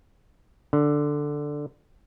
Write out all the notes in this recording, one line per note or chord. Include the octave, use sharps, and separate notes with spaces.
D3